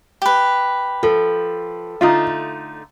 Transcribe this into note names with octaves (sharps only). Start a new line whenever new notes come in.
G4 B4
F3 A4
D3 A3 D#4 F4